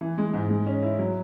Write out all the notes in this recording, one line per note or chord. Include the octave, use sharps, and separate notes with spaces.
E3
G#3
G#2
G#3
C#4
E4
F#3